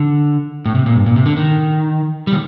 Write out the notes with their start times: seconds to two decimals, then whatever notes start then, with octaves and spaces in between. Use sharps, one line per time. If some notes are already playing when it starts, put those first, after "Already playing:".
Already playing: D3
0.66 A2
0.75 C3
0.86 A#2
0.95 G2
1.06 A#2
1.16 C3
1.26 D3
1.37 D#3
2.27 G3
2.32 D#3